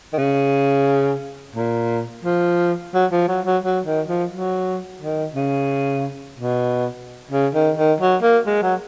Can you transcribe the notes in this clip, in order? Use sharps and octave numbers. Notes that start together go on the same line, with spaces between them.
D#3
C#3
A#2
F3
F#3
F3
F#3
F#3
F#3
D#3
F3
F#3
D#3
C#3
B2
C#3
D#3
D#3
F#3
A#3
G#3
F#3